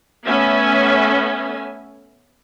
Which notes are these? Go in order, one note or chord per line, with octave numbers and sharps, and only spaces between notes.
A3 B3 C#4 E5 G#5